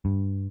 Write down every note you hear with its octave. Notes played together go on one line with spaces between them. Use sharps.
G2